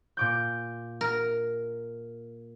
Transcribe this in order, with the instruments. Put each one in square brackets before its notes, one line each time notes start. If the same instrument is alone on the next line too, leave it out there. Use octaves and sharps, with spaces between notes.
[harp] A#2 D6 G6
[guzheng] A#4